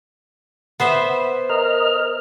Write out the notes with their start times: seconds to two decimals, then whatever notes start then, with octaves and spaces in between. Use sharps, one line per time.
0.80 B3 C5 E5
1.50 A#4 D#5 F6